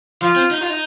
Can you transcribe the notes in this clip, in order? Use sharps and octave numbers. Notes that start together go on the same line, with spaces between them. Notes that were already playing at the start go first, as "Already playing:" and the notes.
F3 F4
C4
D#4
F4
D#4